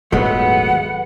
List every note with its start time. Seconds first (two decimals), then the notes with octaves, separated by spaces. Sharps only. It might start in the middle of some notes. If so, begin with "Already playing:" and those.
0.12 D#1 G#2 F#3 G#3 A3 B3 F#5